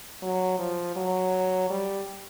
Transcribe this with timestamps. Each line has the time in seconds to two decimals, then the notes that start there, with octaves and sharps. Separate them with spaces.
0.23 F#3
0.59 F3
0.96 F#3
1.70 G3